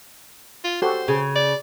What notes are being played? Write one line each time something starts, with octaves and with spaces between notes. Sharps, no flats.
F4
F#4 G4 A4 C5
C#3
D5